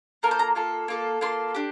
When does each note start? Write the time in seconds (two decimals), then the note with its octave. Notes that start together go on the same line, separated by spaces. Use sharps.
0.23 A#3 F4 A4 A#4
0.31 C5
0.39 A#5
0.55 A#3 F4 A4
0.88 A#3 F4 A4
1.21 A#3 F4 A4 C6
1.55 D4 G4